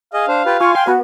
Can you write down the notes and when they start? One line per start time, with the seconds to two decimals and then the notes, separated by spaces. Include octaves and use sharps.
0.14 G#4 D#5 F5
0.28 D4 C5
0.46 F4 G4 B4
0.60 F4 G#5 C#6
0.75 G5 C6
0.87 B3 F#4